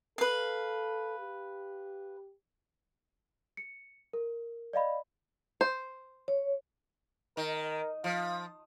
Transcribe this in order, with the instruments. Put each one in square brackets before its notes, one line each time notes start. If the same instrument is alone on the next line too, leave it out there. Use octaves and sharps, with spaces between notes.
[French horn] A4 [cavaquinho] B4 F5
[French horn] G4
[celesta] C#7
A#4
D5 D#5 F5 B5
[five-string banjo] C5
[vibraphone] C#5
[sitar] D#3 [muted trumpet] A#4
[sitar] F3 [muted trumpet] F5